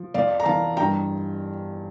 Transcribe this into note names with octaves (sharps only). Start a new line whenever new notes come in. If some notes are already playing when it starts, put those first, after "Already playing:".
Already playing: F3
F2 D5 F5
A#5
E3 F5 A5
G2 G5 A#5